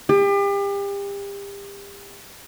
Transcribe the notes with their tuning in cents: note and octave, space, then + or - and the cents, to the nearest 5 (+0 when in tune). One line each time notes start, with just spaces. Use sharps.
G4 +35